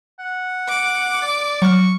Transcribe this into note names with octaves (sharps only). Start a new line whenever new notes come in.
F#5
D6
D5
F#3 C#6 F6